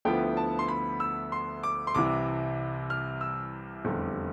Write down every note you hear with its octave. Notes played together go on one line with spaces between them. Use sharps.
D2 D3 F3 B3 E4 G5
A5
C6
B5
E6
C6
D6
C6
C2 C3 E3 D6
F6
E6
F1 E2 D3 G3